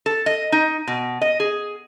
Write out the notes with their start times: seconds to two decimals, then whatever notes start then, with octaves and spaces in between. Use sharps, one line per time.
0.06 A4
0.26 D#5
0.52 D#4
0.87 B2
1.22 D#5
1.40 G#4